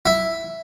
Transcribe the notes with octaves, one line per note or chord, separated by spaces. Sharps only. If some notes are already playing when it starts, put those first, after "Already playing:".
E4